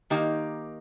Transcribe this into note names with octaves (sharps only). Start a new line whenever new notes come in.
D#3 A#3 D#4 G4